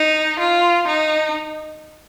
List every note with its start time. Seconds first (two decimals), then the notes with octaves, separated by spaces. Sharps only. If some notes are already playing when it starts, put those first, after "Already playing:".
Already playing: D#4
0.40 F4
0.88 D#4